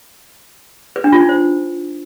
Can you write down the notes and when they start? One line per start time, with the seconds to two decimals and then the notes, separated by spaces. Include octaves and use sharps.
0.96 B4
1.04 D4
1.12 F4
1.21 D#4
1.29 C5